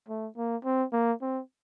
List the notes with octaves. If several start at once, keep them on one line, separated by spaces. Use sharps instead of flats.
A3
A#3
C4
A#3
C4